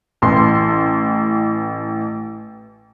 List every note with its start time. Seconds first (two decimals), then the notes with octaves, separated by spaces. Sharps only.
0.22 A1 E3 C6